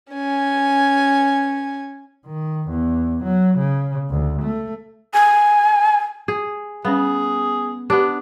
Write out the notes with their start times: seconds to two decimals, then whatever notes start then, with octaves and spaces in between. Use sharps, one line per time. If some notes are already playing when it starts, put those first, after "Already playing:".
0.12 C#4 G#5
2.26 D#3
2.69 E2
3.24 F#3
3.58 C#3
4.10 D2
4.42 A3
5.14 G#5
6.28 G#4
6.85 G3 B3 C#4 G#4
7.90 B3 D4 G4